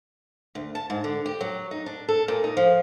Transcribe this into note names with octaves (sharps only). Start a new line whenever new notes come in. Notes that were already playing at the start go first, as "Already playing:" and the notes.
D2
A5
G#2
D3
G4
F#3
D#4
D4
A4
A#2
D#4
F3